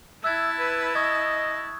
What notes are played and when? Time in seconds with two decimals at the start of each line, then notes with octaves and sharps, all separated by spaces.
0.24 E4 E5 A5 E6 F#6 G#6
0.59 B4
0.95 D#5 C#6 D#6 G#6